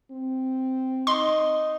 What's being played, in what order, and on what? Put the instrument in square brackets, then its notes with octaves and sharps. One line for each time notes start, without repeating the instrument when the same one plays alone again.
[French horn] C4
[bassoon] D#4 [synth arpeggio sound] C6